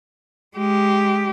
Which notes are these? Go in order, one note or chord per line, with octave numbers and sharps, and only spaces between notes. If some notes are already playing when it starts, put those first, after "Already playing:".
G#3 G4